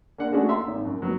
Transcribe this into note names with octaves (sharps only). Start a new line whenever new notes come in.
A#3 D4 F#5
A3 C#4 D4 E4 F#4 G#4
E5 A#5 C6
G#1
F#2
F#3 B3